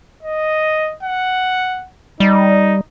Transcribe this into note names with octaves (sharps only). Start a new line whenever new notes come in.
D#5
F#5
G3 D#4